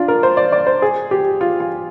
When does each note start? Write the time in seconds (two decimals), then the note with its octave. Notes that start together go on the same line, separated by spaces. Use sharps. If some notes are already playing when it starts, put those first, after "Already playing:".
Already playing: D4 F4
0.08 A#4
0.23 C5
0.37 D5
0.52 D5
0.67 C5
0.82 G#4
1.11 G4
1.41 F4
1.60 F4